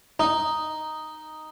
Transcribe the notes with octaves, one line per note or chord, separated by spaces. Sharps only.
D#4